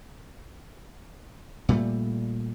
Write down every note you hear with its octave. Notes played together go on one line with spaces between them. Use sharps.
A#2 G3 A3